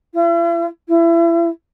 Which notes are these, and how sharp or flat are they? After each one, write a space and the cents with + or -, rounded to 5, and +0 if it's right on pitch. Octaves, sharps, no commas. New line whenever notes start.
E4 +45
E4 +30